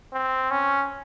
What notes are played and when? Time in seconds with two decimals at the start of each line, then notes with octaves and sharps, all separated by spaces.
0.14 C4
0.51 C#4